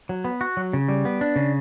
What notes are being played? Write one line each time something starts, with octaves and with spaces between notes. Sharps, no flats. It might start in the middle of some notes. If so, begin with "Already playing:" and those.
F#3
B3
F#4
F#3
C#3
G3
B3
D4
C#3